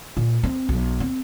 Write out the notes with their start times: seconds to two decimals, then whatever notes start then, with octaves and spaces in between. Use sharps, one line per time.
0.17 A#2
0.43 C4
0.69 B1
1.00 C4